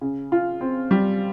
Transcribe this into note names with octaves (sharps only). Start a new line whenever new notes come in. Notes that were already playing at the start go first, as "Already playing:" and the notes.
C#3
F4
C4
G3